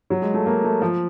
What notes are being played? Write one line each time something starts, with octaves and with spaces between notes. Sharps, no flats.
F#3
G#3
A3
A#3
A3
F3